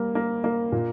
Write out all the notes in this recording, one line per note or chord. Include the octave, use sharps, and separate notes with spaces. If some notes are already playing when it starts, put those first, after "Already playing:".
Already playing: G3 A#3
A#3
A#3
A#2